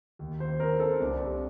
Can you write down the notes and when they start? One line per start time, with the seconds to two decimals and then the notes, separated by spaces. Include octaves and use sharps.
0.19 D#2
0.40 D#2 C5
0.60 C4 A#4
0.79 C4 A4
1.00 C2 D4
1.20 C3